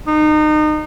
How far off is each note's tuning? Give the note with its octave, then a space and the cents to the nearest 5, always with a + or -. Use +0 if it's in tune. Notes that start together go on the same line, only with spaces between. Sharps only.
D#4 -30